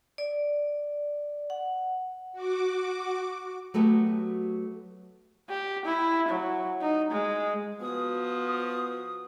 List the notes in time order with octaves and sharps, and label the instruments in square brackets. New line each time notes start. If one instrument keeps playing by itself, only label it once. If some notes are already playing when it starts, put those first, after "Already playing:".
[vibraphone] D5
F#5
[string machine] F#4 D6
[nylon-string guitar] F#3 A3 B3 F#4 G4
[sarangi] G4
E4
F#3
D#4
G#3
[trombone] F3 [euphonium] B3 [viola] F#4 [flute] D#6